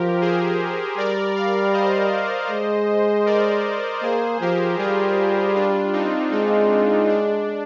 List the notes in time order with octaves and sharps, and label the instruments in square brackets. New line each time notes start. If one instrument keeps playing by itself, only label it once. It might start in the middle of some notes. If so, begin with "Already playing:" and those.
Already playing: [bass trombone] F3 [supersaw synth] G4 A#4
[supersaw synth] G#4 C5
[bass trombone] G3 [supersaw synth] A#4 D5
[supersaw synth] D5 F5
C5 D#5
[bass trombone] G#3
[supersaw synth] A#4 D5
[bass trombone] A#3 [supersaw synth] G#4 C5
[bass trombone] F3 [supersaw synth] G4 A#4
[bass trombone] G3 [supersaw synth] F4 G#4
[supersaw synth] D4 F4
C4 D#4
[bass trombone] G#3 [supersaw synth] C4 D#4
[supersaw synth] D4